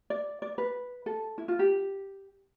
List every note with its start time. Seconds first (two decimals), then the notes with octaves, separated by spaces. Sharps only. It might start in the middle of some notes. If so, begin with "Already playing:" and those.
0.10 D5
0.42 D5
0.58 B4
1.06 A4
1.38 E4
1.48 F4
1.59 G4